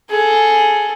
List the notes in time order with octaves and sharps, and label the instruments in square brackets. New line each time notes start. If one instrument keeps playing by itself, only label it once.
[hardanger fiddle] G#4 A4